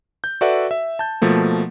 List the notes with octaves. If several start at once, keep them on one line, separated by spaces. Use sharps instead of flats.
G6
F#4 A4 B4 D5 E5 F#5
E5
A5 G6
B2 F3 A3 A#3